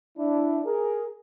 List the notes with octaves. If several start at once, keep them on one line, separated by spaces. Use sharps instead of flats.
D4 E4
G#4 A#4